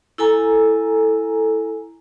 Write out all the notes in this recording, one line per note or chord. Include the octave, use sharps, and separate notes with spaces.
E4 A4 G#5 A#5